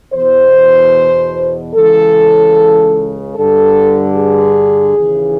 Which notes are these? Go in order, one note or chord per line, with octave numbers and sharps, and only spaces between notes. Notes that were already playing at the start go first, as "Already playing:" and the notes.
E2 B2 C5
C#2 C#3 E3 A4
G2 D3 A4
G#4
D#2 C#3 E3